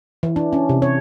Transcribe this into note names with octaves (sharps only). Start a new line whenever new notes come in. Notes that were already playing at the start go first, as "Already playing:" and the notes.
E3
D4
C#4
C3
C#5